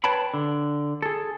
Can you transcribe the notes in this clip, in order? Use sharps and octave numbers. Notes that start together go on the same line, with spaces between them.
B4 C#5 G5 A5 B5
D3
G#4 A4